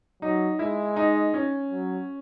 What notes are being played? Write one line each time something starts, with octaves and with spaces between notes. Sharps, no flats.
F#3 D#4
G#3 E4
D#4
C#4
F#3